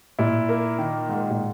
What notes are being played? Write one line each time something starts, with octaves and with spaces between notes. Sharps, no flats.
A#2 E4
A#3
D#3
G#2
A#2